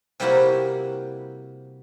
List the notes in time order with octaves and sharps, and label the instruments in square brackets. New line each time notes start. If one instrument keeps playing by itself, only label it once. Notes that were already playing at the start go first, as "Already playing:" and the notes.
[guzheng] C3 G3 A#3 E4 F#4 A#4